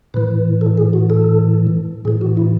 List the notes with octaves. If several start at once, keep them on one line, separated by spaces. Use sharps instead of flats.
A2 E3 B4
A4
G#4
F#4
A4
A2 E3 G#4
F#4
E4